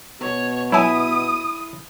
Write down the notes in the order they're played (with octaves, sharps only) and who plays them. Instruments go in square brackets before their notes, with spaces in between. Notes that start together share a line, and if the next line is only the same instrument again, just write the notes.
[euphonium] B2 [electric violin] C#5
[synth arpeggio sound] F#3 G#5 [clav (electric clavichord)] E4 E5 [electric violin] D#6